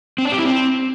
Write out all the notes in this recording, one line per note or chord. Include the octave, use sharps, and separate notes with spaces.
C4
D4
G4
E4
C4